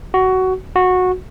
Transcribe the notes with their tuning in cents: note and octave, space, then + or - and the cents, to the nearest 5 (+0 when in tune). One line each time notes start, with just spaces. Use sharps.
F#4 +15
F#4 -15